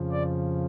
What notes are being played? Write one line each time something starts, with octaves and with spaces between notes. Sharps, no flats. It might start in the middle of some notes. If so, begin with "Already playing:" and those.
Already playing: F2 C#3 F3
D5